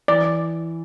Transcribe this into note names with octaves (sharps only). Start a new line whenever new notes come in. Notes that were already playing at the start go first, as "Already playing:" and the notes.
E3 D5